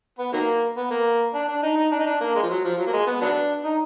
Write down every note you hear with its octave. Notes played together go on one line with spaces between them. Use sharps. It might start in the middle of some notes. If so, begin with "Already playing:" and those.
B3
D#3 F#3 A#3
B3
A#3
D4
D4
D#4
D#4
D4
D#4
D4
A#3
G#3
F3
F#3
F3
F#3
A#3
G#3
B3
F#3 B3 D4
D#4